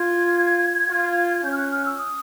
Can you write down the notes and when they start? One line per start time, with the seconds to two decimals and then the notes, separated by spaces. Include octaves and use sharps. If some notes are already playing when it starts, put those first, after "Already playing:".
Already playing: F4 G#6
0.89 F4
1.44 C#4 G6
1.52 F6
1.57 F#6
1.71 F6
1.85 E6
1.98 D#6